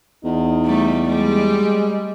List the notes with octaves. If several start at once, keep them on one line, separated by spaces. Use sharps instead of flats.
E2 D#4
G3 A3
G3 G#3